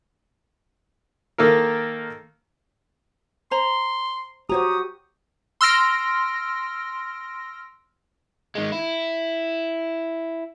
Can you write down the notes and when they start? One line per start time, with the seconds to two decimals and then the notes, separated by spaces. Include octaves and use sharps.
1.38 D#3 A#3 A4 A#4
3.51 C5 A#5 C6
4.49 F#4 G4 C5 C#5 A#5 D#6
5.61 C6 E6 F6 A#6 D7
8.55 D#3 G#3
8.72 E4